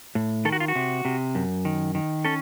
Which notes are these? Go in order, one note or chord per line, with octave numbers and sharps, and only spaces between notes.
A2
D#3 A4
F#4
F4
F#4
C3
C3
F#2
D#3
D#3
C#4 A4